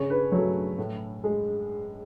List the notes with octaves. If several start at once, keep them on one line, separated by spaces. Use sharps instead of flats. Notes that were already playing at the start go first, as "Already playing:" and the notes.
Already playing: C#3 C#5
B4
F#3 A3 C#5
A2
G#3